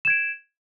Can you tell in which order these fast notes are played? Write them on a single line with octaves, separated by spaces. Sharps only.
E7 G#6 D7